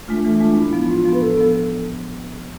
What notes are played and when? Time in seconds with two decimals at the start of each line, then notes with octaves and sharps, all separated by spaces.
0.08 G#3 A3 D4 F4
0.24 E3 A3
0.40 G#3 D4 F4
0.57 A2 E4
0.73 F3 B3
0.89 A2 F4
1.05 F3 B3
1.14 B4
1.21 A2 A4
1.37 F3 B3